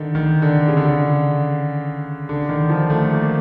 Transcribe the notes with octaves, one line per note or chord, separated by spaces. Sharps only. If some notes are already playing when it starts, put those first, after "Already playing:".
Already playing: D3 D#3
D#3
D3
C#3
D3
C#3
D3
D#3
F3
A3
A#3